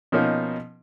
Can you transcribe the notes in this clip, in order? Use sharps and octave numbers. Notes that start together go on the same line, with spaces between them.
B2 F3 A#3 C#4 D#4